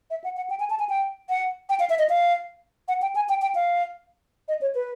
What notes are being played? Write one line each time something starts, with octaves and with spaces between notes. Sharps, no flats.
E5
F#5
F#5
G5
G#5
A5
G#5
G5
F#5
G5
F5
E5
D#5
F5
F#5
G5
G#5
G5
G5
F5
D#5
C#5
B4